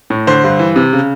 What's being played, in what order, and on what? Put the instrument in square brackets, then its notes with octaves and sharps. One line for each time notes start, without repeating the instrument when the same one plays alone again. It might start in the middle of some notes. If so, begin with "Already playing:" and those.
[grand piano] A2
D3 C5
G2
E3
C3
C#3